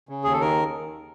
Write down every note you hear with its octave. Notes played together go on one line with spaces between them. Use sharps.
C#3
D#2 G#4
A4
D#3 A#4